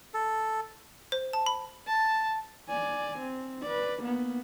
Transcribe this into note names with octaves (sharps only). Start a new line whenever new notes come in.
A4
C5
A5
B5
A5
D5 G#5
C4
B4 D5
A#3 B3